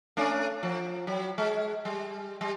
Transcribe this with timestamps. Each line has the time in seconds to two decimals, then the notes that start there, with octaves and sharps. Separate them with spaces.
0.17 A3 C#4 D4
0.63 F3
1.07 F#3
1.38 G#3
1.85 G3
2.41 G3